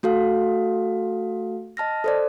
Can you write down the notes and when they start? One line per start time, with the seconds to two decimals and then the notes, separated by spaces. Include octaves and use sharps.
0.03 A3 F#4 A4 F5
1.77 D#5 A5 F6 A#6
2.04 A4 C5 D5